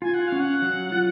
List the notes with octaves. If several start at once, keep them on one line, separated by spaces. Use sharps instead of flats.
F4 G#5
F#5
C#4 F5
F#5
F#3
F4